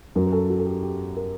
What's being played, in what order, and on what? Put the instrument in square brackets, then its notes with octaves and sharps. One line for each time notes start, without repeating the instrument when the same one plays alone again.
[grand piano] F#2 F#3 A#4
A#4
A4
F#4
A4
G4
G4
A#4